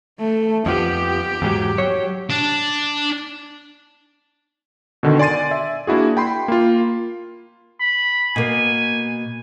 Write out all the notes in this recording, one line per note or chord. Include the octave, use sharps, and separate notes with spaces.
A3
F2 F3 B3 G4
E2 G#2 F#3
F#3 C#5
D4
B2 D3 D#3
D5 G#5 C6 A6 D#7
E5
A#3 D4 E4 F#4 G#4
G5 B5 C6
A#3 F4
B5
B2 A#3 G#5